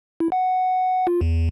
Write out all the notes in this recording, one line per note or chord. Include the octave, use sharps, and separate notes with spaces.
E4
F#5
F4
E2